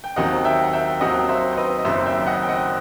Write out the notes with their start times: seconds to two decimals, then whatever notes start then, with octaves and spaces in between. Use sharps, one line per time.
0.04 G5
0.16 D#2 D#3 F#3 C4 D#5 F#5
0.44 E5 G5
0.64 F#5
0.73 E5 G5
1.01 D#2 D#3 F#3 C4 D#5 F#5
1.29 C5 E5
1.53 C5
1.57 B4 D#5
1.79 D#5
1.85 F#1 F#2 D#3 F#3 C4 C5 E5
2.06 E5 G5
2.27 D#5 F#5
2.42 G5
2.49 D#5 F#5